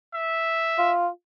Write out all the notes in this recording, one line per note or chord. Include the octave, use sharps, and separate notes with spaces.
E5
F4